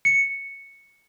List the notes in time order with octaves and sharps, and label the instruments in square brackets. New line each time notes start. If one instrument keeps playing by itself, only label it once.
[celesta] C#7